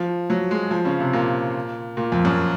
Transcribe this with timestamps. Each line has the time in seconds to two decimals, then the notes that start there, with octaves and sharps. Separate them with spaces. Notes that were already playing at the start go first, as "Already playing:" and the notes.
Already playing: F3
0.30 F#3
0.51 G#3
0.71 F3
0.85 C#3
1.00 C3
1.13 A#2
1.97 A#2
2.12 F2
2.25 F#2